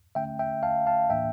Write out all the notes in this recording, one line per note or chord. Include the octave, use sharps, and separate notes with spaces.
D3 A3 C#4 E5 G5
E5 G5
F5 A5
F5 A5
A2 E3 A#3 D4 E5 G5